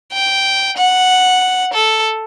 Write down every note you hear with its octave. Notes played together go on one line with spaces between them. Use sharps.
G5
F#5
A4